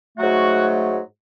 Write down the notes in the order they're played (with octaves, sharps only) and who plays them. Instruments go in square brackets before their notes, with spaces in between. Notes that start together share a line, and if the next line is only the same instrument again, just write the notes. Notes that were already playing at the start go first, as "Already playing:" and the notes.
[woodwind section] G#2 F#3 A3 F#4